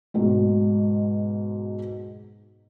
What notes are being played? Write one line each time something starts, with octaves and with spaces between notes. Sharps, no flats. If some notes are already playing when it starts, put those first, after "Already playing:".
G#2 B2 F#3 G#3